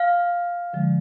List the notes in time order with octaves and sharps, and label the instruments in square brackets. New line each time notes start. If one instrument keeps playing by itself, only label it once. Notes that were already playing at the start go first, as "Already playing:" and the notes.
Already playing: [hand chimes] F5
[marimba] D3 F3 G#3